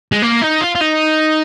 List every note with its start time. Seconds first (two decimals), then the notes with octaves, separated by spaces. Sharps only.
0.12 G#3
0.22 A#3
0.42 D#4
0.61 F4
0.75 F4
0.81 D#4